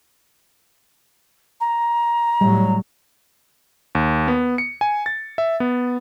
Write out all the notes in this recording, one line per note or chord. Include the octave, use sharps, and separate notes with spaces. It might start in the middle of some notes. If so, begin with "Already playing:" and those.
A#5
A2 F#3 G3
D#2
B3
C#7
G#5
A6
E5
B3